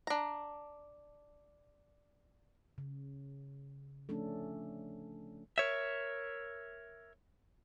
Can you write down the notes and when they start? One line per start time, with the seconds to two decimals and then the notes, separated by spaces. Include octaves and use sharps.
0.07 D4 A#5
2.78 C#3
4.09 F3 A3 C#4 D4 A4
5.58 A#4 C#5 E5